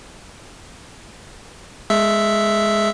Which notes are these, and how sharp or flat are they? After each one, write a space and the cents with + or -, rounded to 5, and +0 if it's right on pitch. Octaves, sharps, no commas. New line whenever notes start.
G#3 +0 E5 +0